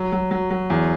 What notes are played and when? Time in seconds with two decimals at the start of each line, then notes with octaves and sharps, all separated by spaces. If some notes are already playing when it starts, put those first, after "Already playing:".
Already playing: F#3
0.12 F#3
0.31 F#3
0.51 F#3
0.70 E2